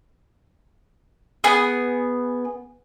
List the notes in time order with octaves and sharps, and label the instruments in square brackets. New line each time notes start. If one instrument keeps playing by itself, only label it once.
[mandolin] B3 G#4